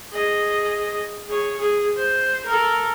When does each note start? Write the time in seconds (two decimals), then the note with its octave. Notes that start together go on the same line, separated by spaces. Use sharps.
0.12 G#4 D#5
1.28 G#4 C#5
1.58 G#4
1.97 C5
2.45 A4 A#4